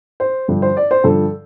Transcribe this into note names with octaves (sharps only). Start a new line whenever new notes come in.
C5
G2 D3 F3
C5
D5
C5
G2 D3 F3 A4